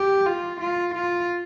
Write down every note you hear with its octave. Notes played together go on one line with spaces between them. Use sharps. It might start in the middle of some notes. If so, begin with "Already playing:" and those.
Already playing: G4
F4
F4
F4